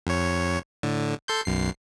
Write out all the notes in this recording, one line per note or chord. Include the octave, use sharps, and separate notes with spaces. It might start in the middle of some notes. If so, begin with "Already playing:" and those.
F2 C#5
A2 D3
A4 C6 G6
B1 F#2 C7